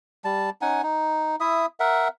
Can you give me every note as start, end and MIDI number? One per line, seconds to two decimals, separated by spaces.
0.24 0.50 55
0.24 0.50 81
0.62 0.82 61
0.62 0.82 63
0.62 0.82 78
0.62 0.82 80
0.83 1.36 63
1.40 1.66 64
1.40 1.66 76
1.40 1.66 87
1.80 2.08 70
1.80 2.08 76
1.80 2.08 78